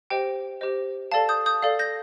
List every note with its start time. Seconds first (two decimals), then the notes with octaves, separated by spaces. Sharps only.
0.10 G4 C5 D#5 G5
0.61 G4 C5 D#5
1.12 A4 D5 F5 A5
1.29 D#6 G6
1.46 D#6 G6
1.62 A4 D5 F5
1.79 G6 A#6